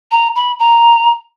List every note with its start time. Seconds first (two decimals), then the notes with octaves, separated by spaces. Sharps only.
0.11 A#5
0.35 B5
0.59 A#5